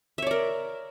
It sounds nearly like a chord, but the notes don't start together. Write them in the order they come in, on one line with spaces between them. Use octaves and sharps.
E5 C#5 D5 A#4